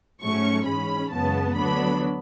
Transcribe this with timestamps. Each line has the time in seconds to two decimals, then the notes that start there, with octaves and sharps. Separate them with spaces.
0.21 G#2 F#3 A3 C#4 C#6
0.65 G#2 E3 G#3 C#4 B5
1.11 F#2 C#3 E3 G#3 B3 A5
1.55 D2 D3 F#3 B3 D4 B5